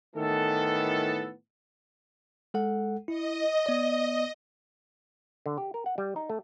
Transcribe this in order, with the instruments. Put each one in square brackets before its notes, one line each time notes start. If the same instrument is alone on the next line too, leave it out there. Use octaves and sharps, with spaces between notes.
[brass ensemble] A2 D#3 E3 B3 A4
[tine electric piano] G#3 A4 F#5
[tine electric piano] E4 [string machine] D#5
[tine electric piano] B3 D5
[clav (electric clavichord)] D3
G4
A#4
F#5
G3
D#4
A3